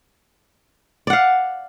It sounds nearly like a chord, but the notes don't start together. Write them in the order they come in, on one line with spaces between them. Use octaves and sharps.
D5 F#5 F5